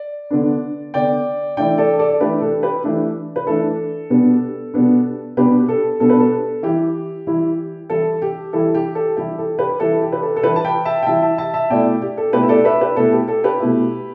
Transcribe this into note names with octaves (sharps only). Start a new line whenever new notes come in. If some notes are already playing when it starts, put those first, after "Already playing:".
Already playing: D5
D3 B3 D4
D3 B3 D4 D5 G5
E3 A3 D4 D5 G5
A4 D5
A4 D5
D5
E3 A3 D4 G4 B4
A4
G4 B4
E3 A3 D4
B4
E3 A3 D4 A4
B2 G3 B3 D4
B2 G3 B3 D4
B2 G3 B3 D4 G4 B4
A4
B2 G3 B3 D4 A4
B4
A4
E3 G3 E4 G4
E3 G3 E4
E3 G3 E4 A4
G4
E3 G3 E4 A4
G4
A4
E3 G3 E4 G4
A4
G4 B4
E3 G3 E4 A4
G4
B4
A4
A4
E3 G3 E4 G4 B4
A5
G5 B5
E5 A5
G5
E3 G3 E4 E5 A5
E5 A5
E5 A5
E5 A5
B2 A3 E4 D5 G5
G4
A4
B2 A3 E4 G4 B4
E5
A4 D5
B4 E5
G4 B4
B2 A3 E4 A4
G4
A4
G4 B4
B2 A3 E4